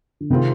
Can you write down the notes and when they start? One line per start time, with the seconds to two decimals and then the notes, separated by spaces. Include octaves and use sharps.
0.20 D3
0.30 C3 D#3 G#3 C4 F4